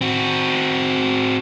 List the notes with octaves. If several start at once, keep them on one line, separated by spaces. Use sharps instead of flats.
C4 F#4